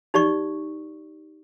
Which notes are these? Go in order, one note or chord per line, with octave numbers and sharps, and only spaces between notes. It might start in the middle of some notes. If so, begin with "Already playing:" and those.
D#4 G4 D5 C#6